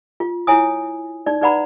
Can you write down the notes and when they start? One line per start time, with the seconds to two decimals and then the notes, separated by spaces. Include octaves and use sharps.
0.20 F4
0.47 E4 C#5 G#5 D#6
1.26 D#4 D5
1.42 D#4 B4 D5 F#5 A#5 B5